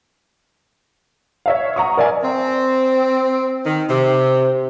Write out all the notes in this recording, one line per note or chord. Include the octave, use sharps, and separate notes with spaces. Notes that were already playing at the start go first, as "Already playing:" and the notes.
C#5 E5 F5
F#5 A#5 C#6 D#6
A#4 D5 E5 G#5
C4
D#3
C3